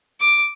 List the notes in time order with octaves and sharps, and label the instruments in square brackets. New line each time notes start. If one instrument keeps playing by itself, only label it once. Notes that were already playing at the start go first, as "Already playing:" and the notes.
[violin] D6